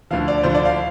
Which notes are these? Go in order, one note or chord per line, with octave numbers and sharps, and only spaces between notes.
D2 D3 F3 F5
D5
D2 D3 F3 C5
D5
F5